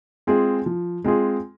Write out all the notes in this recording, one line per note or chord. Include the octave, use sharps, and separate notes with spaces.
G#3 C4 F4 G#4
F3
G#3 C4 F4 G#4